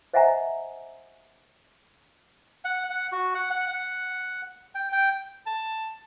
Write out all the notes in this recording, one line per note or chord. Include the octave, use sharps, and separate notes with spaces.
C5 D#5 E5 F#5 G#5 A#5
F#5
F#5
F#4
F#5
F#5
F#5
G5
G5
A5